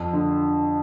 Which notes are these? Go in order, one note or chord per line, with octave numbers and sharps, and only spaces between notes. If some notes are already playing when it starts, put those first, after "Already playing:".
Already playing: F2
D3